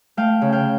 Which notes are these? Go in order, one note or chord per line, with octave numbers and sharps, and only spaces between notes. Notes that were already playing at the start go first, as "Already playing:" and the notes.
A3 F5 G5
C#3
F5 G5